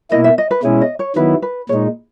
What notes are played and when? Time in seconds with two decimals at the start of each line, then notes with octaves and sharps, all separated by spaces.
0.11 B2 A#3 E4 D#5
0.24 E5
0.38 D#5
0.51 B4
0.63 B2 G#3 C#4 E4 G#4
0.81 D#5
0.99 C#5
1.16 D#3 F#3 B3 E4 B4
1.42 B4
1.69 A#2 G#3 D#4 C#5